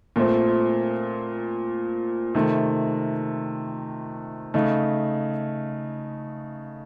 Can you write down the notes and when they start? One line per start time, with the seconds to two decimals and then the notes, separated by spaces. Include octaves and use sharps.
0.16 A#2 A3 C4
2.35 C3 D#3 A3
4.54 C#3 A3 D#4